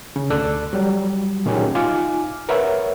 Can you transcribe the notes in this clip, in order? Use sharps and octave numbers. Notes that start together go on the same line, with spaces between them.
C#3
D2 A4 D5 E6 F#6
F#3 G3
A#2 D#3 F#3 C#4 G4 G#4
D#4 F4 G#5 D6 F6
A#4 B4 C#5 E5 F#5